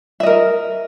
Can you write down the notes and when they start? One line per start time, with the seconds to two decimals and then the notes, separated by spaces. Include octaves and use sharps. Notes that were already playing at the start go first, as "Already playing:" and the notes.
0.20 E5
0.23 D#5
0.26 A#4